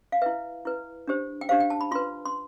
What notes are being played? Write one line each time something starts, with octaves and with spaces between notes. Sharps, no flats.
F5
E4 B4 E5
E4 B4
D4 G4 C5
G5
D4 G4 C5 F5
G5
A5
B5
F4 B4 C6
C6